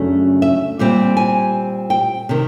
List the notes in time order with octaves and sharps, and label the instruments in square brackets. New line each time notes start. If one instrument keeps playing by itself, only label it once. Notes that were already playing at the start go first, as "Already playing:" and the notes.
Already playing: [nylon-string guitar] F#2 C#3 F#3 A3 D4
E5
A#2 G3 C4
G#5
G5
C3 D#3